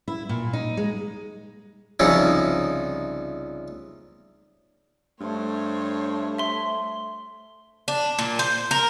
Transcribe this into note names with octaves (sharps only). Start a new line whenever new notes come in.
E4
A#2
D#4
G#3
C2 C#3 F3 C#4 D#4 E4
G2 A3 C5 C#5
E5 C6
D4
A#2
C5
A#4